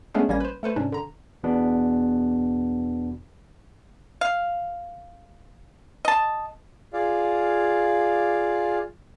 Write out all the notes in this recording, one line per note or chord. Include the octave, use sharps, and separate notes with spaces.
G#3 A3 B3 C#4 D4 G#4
A1 G3 A#3 C#4 G#6 A#6
B4 C5
A3 A4 B4 C5
G#2 C3 C#4 D4
D3 A#5
E2 B2 B3 D4
F5
D#5 A5
F4 G#4 D5 F5